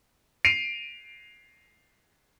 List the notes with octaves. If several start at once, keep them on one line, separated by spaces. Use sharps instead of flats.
C7 D7 D#7 F7